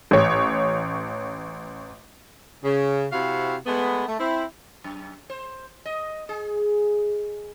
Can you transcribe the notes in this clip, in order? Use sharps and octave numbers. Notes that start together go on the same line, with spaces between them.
A1 C#5
C#3
C3 C4 E4 F#4 F5
G#3 A3 B3
A3
C4 E4
F#2
C5
D#5
G#4